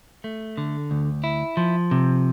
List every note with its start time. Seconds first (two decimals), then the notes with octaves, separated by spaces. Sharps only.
0.24 A3
0.58 D3
0.91 D2
1.24 E4
1.57 F3
1.91 C3